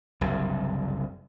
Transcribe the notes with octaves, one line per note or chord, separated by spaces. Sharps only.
F#1 C2 G2